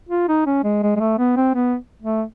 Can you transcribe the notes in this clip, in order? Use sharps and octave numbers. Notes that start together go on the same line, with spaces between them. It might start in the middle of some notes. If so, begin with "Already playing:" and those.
F4
D#4
C#4
G#3
G#3
G#3
A3
B3
C4
B3
A3